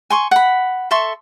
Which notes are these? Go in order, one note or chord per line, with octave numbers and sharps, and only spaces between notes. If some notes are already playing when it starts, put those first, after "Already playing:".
G#5 C6 C#6
F#5 B5
A4 E5 C6 C#6